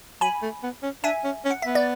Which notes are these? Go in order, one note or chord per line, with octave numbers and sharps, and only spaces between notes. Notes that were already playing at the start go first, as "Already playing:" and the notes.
F#3 G#5 B5
A3
B3
C#4
D4 E5 G#5
C#4
C#4
F#5
B3 E5
D5